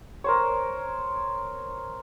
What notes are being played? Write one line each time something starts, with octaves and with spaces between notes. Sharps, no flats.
A#4 C5 C#5